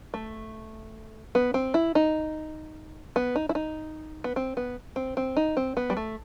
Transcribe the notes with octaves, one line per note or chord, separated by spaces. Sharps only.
A3
B3
C4
E4
D#4
B3
D#4
E4
D#4
B3
C4
B3
C4
C4
D#4
C4
B3
G3
A3